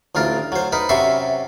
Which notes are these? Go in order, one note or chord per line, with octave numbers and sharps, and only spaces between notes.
A1 D2 F4 A#4
F#3 C5
D#4 A#4 B4
F#2 C3 F#4 E5 C6 C#6